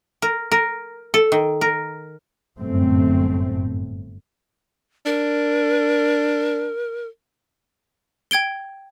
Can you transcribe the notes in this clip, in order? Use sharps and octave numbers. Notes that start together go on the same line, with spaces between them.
A#4
A#4
A4
D#3
A#4
G1 F#2 A2 A3 C4
D4 A#4
G5 G#6 D7 G7